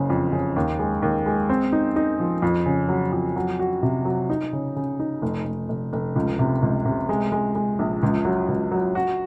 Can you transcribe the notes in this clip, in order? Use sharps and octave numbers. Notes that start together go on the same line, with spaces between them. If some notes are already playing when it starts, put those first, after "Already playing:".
Already playing: F#1 C#3
F2
C#3
D#2
G#3
D#2
G#3
C4
D#4
D#4
F3
F2
C#3
F#3
F2
F#3
F#4
C3
F#3
D#4
C#3
C#3
D#4
F1
F1
F1
F1
C#2
C3
C#2
C3
G#3
G#3
G#3
A#1
C#2
F#3
C#2
F#3
F#4